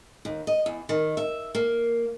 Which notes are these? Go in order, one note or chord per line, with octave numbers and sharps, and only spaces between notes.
D#2
D#5
E2
D#3
E5
A#3